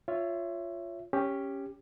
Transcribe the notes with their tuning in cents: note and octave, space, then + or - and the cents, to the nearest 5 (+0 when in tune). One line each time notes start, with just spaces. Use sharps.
F4 +0 C#5 +5 E5 +20
C#4 +0 G4 +10